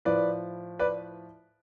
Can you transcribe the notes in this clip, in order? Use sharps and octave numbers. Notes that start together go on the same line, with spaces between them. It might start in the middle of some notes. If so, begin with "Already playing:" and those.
A2 F3 B4 D5
B4 D5